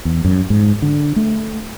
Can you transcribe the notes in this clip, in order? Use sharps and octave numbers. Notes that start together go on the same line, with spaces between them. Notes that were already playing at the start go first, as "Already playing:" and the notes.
E2
F#2
G#2
D3
A3